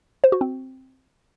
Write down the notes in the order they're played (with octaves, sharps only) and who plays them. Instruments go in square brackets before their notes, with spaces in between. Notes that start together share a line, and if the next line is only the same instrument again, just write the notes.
[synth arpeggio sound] C5
F#4
C4